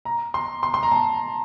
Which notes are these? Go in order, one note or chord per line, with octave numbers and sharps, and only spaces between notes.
A#5
C6
C6
C6
A#5
A5